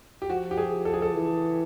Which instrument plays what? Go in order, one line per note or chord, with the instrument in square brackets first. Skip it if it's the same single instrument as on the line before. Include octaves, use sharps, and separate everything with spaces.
[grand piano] G4
[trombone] F3 [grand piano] F#4
[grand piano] G4
G#4
A4
G#4
A4
[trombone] E3